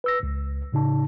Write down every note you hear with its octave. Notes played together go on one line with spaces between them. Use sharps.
B4 E6 A#6
C#2
A2 C#3 D#4 A5